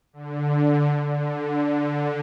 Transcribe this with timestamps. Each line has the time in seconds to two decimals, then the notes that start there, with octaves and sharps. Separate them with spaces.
0.13 D3
0.78 D3
1.10 D3